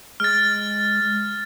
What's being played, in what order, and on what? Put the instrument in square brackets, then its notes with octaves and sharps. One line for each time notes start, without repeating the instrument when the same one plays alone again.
[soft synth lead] G#3 [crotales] F6 A6